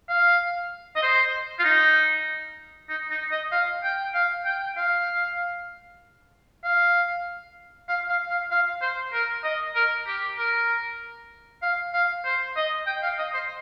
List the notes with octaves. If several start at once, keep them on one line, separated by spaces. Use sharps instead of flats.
F5
D#5
C5
F4
D#4
D#4
D#4
D#5
F5
G5
F5
G5
F5
F5
F5
F5
F5
F5
C5
A#4
D#5
A#4
G4
A#4
F5
F5
C5
D#5
G5
F5
D#5
C5